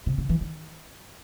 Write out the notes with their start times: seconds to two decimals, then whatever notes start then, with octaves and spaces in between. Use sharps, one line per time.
0.06 C3
0.18 C#3
0.29 E3
0.41 D#3